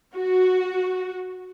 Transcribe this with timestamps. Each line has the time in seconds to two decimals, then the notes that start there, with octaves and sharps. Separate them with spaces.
0.14 F#4